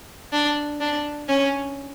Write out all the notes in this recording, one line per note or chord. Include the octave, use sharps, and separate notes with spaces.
D4
D4
C#4